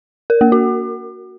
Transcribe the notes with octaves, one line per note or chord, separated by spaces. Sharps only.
A#4
A#3
F#4